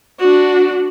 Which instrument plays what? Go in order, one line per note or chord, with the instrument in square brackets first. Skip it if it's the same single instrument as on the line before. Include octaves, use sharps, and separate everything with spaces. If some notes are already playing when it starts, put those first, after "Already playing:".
[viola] D4 F#4